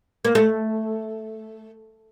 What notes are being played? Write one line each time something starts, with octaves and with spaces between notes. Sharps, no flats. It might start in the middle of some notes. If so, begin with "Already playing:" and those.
A#3
A3